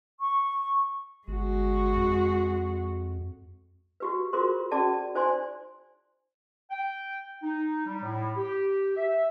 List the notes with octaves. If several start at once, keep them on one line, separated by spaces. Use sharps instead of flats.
C#6
G1 G#3 F#4
F2
F#4 G4 B4
F4 F#4 G#4 A#4 C5 C6
C#4 F#4 G#4 D5 A5
D#4 C5 D5 G#5 C6
G5
D#4
G3
A2
G4
E5